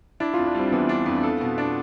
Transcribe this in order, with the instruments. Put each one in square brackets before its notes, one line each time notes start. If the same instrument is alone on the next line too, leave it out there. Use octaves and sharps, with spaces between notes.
[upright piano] D4 [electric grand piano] E4
[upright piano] F2 [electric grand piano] F4
[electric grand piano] D4
[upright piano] G3 [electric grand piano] C4
[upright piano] E3 [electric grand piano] B3
[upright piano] D4
F2
A4
B2
D4